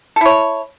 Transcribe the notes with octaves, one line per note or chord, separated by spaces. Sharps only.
E4 A4 C#5